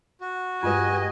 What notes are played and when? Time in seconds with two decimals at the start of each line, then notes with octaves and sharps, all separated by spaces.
0.21 F#4
0.63 G2 G#3 F4 G4 B4 D#5 G#5